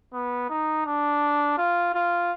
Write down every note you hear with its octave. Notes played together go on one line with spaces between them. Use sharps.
B3
D#4
D4
F4
F4